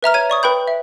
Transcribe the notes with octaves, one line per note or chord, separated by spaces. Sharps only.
B4 E5 A#5 F6
C#5 G#6 D#7
D5 C#6 D#6
B4 G5 B5 G6
E5